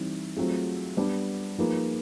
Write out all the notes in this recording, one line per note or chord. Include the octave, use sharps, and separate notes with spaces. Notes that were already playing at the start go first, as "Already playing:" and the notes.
Already playing: E3 G3 C4 D#4
F#3 A3 C4 F4 G#4
G3 B3 D4
F3 A#3 D#4 G#4 B4